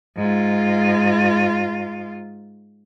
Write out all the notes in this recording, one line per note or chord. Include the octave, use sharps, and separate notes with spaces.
G#2 F4